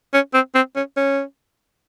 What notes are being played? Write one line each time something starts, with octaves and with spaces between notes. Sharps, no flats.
C#4
C4
C4
C#4
C#4